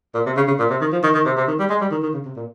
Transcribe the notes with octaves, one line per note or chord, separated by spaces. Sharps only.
A#2
C3
C#3
C#3
A#2
C3
D#3
F3
D#3
D#3
C3
C3
D#3
G3
G#3
G3
D#3
D#3
C#3
C3
A#2